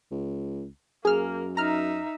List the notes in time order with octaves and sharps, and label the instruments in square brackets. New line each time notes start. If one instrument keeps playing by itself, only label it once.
[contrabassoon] C#2
[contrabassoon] F#2 [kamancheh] A#3 [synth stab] G#4 F6
[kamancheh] D#4 E5 [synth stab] A#5 F6